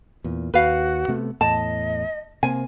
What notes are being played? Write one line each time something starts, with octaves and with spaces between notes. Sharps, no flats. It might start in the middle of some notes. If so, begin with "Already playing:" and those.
E2 A#2
D#2 F#4 B4 F5
C3 A3 B3
E2 A2 D#5 A5
C3 A#3 C4 G#5